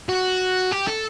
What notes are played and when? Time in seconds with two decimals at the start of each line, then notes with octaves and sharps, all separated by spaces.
0.09 F#4
0.72 G4
0.88 A4